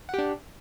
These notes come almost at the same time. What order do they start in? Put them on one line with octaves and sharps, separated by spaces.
F#5 G4 D4